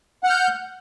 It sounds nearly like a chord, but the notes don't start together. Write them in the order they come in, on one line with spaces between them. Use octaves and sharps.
F#5 F6 G6